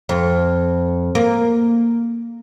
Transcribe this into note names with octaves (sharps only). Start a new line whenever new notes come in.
F2
A#3